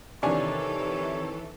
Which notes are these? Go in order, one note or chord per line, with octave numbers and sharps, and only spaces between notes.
C3 D#3 E3 D4 A4 C#5 G#5